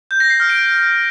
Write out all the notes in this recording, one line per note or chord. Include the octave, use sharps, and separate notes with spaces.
G6
A#6
C7
F6
D7